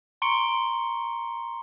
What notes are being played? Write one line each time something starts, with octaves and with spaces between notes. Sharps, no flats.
A#5 C6 C#6 C#7 D7 G7